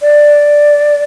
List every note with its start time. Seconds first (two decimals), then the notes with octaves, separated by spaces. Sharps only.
0.02 D5